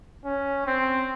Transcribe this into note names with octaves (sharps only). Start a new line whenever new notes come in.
C#4
C4